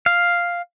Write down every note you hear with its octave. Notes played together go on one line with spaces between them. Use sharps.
F5